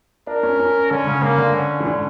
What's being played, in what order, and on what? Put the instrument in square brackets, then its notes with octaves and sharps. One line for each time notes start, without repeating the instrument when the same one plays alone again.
[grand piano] D4 [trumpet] A#4
[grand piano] C#4
C#4
[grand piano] D3 [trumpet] C#4
[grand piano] C#3
[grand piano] C#3 [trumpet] A#3
[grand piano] D3
[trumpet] C#4
[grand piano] E3
D3